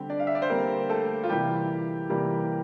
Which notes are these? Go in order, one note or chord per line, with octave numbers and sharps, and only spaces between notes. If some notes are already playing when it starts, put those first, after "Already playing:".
Already playing: D3 G3 C4 G4
D4 D5
F5
E5
D5
C5
D3 G3 A#3 C4 A#4
A3 A4
F4
C3 E3 G3 A#3 G4
C3 E3 G3 A#3